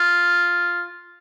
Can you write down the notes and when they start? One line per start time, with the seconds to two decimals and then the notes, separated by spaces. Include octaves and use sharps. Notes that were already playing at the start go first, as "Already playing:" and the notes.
Already playing: F4